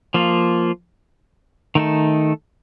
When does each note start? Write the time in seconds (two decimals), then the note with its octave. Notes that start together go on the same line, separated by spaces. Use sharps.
0.14 F3 A#3 F4
1.75 D#3 A3 D#4 A4